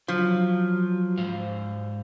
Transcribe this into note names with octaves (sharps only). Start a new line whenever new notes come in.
F3 F#3
G#2 C5 F5